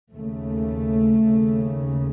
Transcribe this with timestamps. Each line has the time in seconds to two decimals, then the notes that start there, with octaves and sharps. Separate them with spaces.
0.14 D#2 C#3 A3
1.28 D#2 C#3